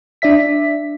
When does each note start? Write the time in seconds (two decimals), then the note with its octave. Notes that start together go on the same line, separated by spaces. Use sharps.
0.22 D4 D5 E5 B6